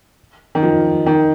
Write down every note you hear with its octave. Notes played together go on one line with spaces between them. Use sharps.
D#3
F3
D#3